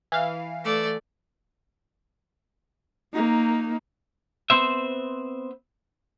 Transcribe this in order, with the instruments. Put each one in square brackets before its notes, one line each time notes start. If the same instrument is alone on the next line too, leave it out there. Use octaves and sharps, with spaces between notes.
[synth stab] E3 F5
[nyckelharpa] A3 D5
[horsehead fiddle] A#3 D#4
[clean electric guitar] B3 C4 C5 E5